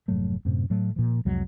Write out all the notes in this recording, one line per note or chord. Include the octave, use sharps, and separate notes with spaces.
F1 G#2 F#3 A3
F#2 A2 C3
A2 F#3 A3
A#2 F3
C2 F2 F#3 G#3